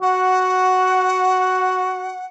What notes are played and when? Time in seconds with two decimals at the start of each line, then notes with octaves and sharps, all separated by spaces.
0.02 F#4 F#5